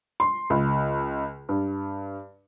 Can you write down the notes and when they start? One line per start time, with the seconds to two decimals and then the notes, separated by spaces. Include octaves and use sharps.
0.20 C6
0.50 C#2
1.49 G2